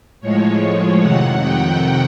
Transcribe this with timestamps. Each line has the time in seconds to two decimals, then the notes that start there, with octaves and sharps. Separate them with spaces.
0.21 A2 F3 G#3 C#5
1.00 F2 C3 D#3 F#5
1.39 G5